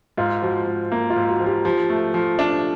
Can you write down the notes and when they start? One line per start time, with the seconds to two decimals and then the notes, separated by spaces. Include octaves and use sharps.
0.18 G#2 F4
0.42 F3 F#4
0.67 G#2
0.92 A#3
1.10 F4
1.16 G#2
1.28 F#4
1.40 F3
1.46 G4
1.65 F3 G4
1.90 A3
2.14 F3
2.39 D4